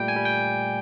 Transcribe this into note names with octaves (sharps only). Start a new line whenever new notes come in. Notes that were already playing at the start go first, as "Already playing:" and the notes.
Already playing: A#2 G3 A3 G5
G#5
G3
G5